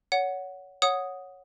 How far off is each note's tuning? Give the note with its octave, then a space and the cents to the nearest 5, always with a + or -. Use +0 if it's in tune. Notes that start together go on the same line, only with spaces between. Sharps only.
C#5 +25 F#5 +0
C#5 -5 F#5 -10 D#6 +0